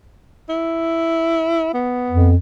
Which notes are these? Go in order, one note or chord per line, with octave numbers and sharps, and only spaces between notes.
E4
B3
F2